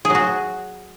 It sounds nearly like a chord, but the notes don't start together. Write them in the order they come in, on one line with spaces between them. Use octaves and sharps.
G#4 F#3 F#4